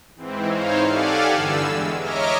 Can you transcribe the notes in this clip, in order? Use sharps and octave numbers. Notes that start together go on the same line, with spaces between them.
G#2 E3 C4
D#4 E4 C5 C#5 F5
G4 A4 D5 F5 F#5 G#5
E2 G2 D3 E6
E3 G#3
C#5 D#5 E5 A#5 D6 F6